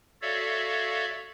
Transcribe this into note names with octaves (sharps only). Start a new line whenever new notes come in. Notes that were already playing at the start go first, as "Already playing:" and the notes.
F#4 A4 C#5 D5 E5 F5